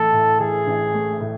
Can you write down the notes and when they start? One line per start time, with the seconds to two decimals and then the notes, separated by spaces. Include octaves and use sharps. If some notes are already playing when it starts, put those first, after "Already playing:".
Already playing: A1 A2 E3 A3 A4
0.13 A2
0.40 E3 G#4
0.66 A1
0.94 A3
1.21 A2